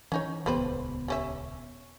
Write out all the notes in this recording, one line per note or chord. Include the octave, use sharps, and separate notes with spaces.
E3 C#4 D#4 C#5
D#1 C#2 G3 B3 B4 C5
G3 C#4 E5